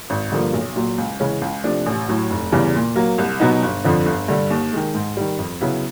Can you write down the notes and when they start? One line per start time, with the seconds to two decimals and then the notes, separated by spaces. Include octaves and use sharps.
0.10 G#1
0.32 G2 D3 F3 A#3
0.53 B1
0.76 A#2 F#3
0.98 C#2
1.20 C#3 E3 G#3 C#4
1.42 C#2
1.64 C3 F3 A3 D4
1.86 A1
2.08 A2 F#3
2.30 F1
2.52 E2 C#3 E3 G3
2.75 A#2
2.96 F#3 A#3
3.18 C2
3.40 B2 F#3 B3 D#4
3.62 G1
3.84 F2 D3 F3
4.06 G1
4.28 G2 D3 G3
4.50 D#2
4.73 D#3 G#3
4.94 G#2
5.17 D#3 G3
5.39 F2
5.61 C#3 F#3 B3 E4